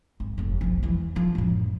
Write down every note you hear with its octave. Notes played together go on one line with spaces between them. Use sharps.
G#1
F1 E2
B1 F3
E2 E3
D3 F3
A1 F#2